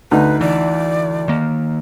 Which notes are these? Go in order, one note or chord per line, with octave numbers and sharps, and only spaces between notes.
D2 D#4 B4
E3 D5
D#3 A#3